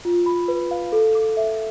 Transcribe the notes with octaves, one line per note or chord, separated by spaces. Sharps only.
F4
B5
B4
F5
A4
D6
E5